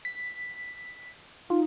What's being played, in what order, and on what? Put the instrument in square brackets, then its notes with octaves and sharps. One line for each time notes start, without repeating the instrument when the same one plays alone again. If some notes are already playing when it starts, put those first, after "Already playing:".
[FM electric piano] B6
[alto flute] D#4 [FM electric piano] F4